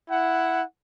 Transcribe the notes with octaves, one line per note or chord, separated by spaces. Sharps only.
E4 F#5